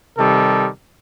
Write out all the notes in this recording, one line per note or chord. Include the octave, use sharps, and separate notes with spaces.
C3 D#3 G3 A4